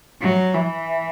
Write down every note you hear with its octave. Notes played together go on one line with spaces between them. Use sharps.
F#3
E3